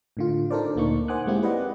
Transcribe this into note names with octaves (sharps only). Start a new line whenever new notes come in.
A2 D3 F4
D4 D#4 A4 A#4 C5 D5
D2 A#2 A#3 D#4 C#6
C5 F#5 G#5 D6 D#6 F#6
G#3 A#3 C4 E4 G4
G4 B4 D5 D#5 F#5